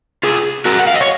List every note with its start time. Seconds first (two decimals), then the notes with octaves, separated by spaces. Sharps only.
0.23 F4 G#4
0.65 F#4 A#4
0.79 F#5
0.87 F5
0.94 D#5
1.01 C#5